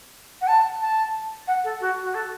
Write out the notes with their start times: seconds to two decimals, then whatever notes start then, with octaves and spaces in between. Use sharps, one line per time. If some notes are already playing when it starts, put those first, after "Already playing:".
0.41 F#5
0.47 A5
0.81 A5
1.47 F#5
1.64 A4
1.80 F#4
2.03 F#4
2.14 A4